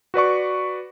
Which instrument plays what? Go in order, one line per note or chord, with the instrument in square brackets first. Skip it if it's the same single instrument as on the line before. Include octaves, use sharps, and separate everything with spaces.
[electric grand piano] F#4 B4 D5 C#6